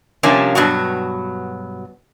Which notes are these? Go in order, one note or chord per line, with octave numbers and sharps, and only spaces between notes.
C3 F3 G3 A#3 C#4 D4
G2 B2 F#3 F#4